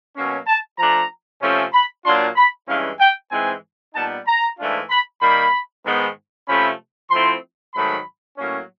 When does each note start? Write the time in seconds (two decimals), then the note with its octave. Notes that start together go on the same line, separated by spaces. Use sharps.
0.16 B2 F#3 A#3 C#4
0.47 A5
0.78 F3 A3 D4 A#5
1.41 C3 F3 A3 C#4
1.73 B5
2.05 A#2 F#3 A#3 D4 F4 C6
2.36 B5
2.68 G2 E3 G#3 C#4 E4 F5
3.00 G5
3.31 G#2 E3 G#3 C4 E4 G#5
3.94 A#2 G3 B3 D#4 A5
4.27 A#5
4.58 G#2 E3 A3 D4 F4
4.90 B5
5.21 D#3 G3 A#3 B5
5.85 G#2 D#3 G#3 B3
6.48 C3 F3 A3 C#4 B5
7.11 F3 A3 C4 E4 C6
7.74 G#2 D#3 F#3 A3 B5
8.37 A2 F#3 A#3 C#4